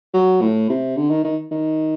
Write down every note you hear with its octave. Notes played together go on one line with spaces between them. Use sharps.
F#3
A2
C3
D3
D#3
D#3
D#3